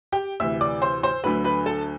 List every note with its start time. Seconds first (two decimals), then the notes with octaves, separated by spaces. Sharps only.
0.12 G4 G5
0.40 D2 C3 E3 E5 E6
0.61 D5 D6
0.82 C5 C6
1.03 C5 C6
1.23 D2 D3 F#3 A3 B4 B5
1.44 B4 B5
1.66 A4 A5